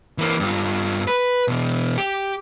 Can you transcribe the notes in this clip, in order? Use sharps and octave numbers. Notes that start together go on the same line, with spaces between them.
E3 A#3
G2 F4
B4
B2 E3
G4